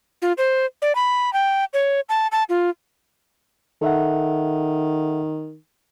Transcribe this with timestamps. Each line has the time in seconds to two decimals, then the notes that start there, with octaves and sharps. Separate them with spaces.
0.22 F4
0.38 C5
0.82 D5
0.95 B5
1.33 G5
1.73 C#5
2.09 A5
2.32 A5
2.49 F4
3.82 D#3 A4 E5 F#5